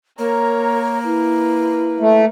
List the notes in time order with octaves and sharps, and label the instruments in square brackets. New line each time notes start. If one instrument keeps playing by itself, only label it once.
[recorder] A#3 [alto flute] A#4 [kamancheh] C#5 A#5
[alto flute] E4 [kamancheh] B4
[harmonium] A3